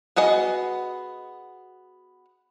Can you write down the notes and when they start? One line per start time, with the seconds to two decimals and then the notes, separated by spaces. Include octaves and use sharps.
0.16 B3 F#4 G#4 D#5